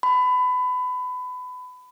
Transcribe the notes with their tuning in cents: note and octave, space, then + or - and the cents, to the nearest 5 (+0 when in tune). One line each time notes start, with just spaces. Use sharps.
B5 +25